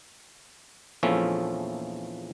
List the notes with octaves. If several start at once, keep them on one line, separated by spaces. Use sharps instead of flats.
A#1 E2 F3 A3 C#4 E5